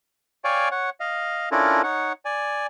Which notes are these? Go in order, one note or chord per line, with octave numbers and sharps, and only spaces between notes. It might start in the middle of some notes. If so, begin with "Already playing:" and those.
C#5 D5 F5 G5 G#5 C#6
C#5 F#5
D#5 F5
C#4 D4 E4 F4 A4 A#4
D#4 C#5 F#5
D5 G#5